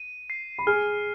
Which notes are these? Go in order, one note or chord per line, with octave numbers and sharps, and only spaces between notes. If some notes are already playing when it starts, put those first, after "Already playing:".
Already playing: D#7
C7
B5
G#4 G#5 F6